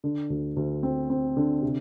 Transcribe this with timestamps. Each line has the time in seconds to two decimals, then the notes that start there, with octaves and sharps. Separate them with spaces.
0.04 D3
0.30 D2
0.56 D2
0.83 C4
1.10 C4
1.37 D3
1.62 C3